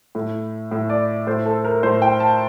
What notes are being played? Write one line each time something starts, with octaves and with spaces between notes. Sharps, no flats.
A2
A2
D5
A2 C5
A4
A#4
A2 C5
G5
A5